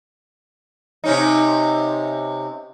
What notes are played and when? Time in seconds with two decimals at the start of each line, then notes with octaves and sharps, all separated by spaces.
1.04 C3 C#4 D#4